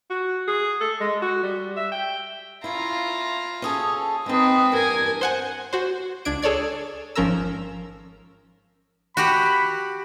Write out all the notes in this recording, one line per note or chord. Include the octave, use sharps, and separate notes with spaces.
F#4
G#4
A4
G#3
F#4
G3
E5
G5
C#4 E4 F4 A#5
C#4 G#4 A4
G#3 C4 D#4 B4
E2 G2 A#4 G#5
C5 F#5 G#5
F#4 C5
C#2 D4 G#6 D7
G#4 A4 C#5 D5 G#6
G#1 F3 C#4 A#4 A#5 E6
F#4 G4 F#5 B5